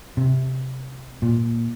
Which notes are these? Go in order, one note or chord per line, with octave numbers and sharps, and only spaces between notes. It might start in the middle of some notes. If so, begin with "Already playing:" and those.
C3
A#2